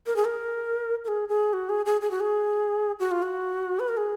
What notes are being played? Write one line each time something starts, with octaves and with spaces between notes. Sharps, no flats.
A#4
G#4
A#4
A#4
G#4
G#4
F#4
G#4
G#4
G#4
F#4
G#4
F#4
F4
F#4
B4
A#4
G#4